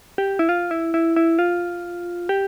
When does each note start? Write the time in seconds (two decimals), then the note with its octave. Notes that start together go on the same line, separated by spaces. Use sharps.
0.18 G4
0.39 E4
0.49 F4
0.71 E4
0.94 E4
1.16 E4
1.39 F4
2.29 G4